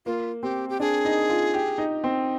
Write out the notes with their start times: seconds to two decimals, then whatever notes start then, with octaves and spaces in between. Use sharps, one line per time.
0.06 A#3 F4
0.43 C4 G4
0.69 G4
0.80 D4 G#4
1.05 D#4
1.30 F4
1.54 G4
1.78 D#4
2.04 C4